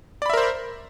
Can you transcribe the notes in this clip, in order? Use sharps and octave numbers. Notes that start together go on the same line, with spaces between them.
A#4 C5 D5 E5 B5